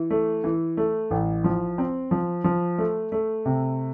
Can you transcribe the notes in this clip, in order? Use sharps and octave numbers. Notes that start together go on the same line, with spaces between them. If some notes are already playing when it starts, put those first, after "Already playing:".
Already playing: E3
A3
E3
A3
A1
F3
C4
F3
F3
A3
A3
C3